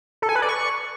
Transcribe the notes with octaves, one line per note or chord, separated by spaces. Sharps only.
A4
G#5
B4
D5
C#6